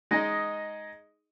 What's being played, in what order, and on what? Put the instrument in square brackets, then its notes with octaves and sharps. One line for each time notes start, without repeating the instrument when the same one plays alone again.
[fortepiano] G#3 D#4 D#5